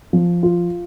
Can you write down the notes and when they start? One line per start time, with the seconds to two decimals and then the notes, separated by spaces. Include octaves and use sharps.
0.13 F3
0.43 F4